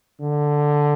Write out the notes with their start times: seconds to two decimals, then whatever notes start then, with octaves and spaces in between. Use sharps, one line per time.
0.20 D3